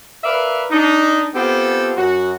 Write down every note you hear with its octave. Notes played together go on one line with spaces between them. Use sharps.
A#4 B4 D5 E5 F5
D4 D#4
B3 C4 F4 G4 A4
F#2 F#4